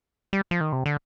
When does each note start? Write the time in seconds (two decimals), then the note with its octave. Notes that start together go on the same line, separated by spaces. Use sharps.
0.33 G3
0.51 F3
0.61 D#3
0.73 C3
0.86 D3